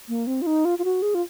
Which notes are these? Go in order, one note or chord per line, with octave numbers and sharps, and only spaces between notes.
A#3
C4
F4
D#4
F4
F4
F#4
G#4
F4